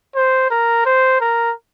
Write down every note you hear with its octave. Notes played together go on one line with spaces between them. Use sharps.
C5
A#4
C5
A#4